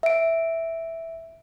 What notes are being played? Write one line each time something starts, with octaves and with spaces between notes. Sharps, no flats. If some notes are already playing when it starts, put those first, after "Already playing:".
E5 D7